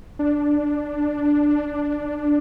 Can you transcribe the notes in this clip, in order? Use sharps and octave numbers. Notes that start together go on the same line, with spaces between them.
D4